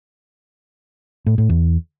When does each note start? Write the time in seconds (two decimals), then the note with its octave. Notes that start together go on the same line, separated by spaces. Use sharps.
1.26 A2
1.38 A2
1.49 E2